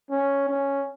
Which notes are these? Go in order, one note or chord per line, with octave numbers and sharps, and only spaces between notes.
C#4
C#4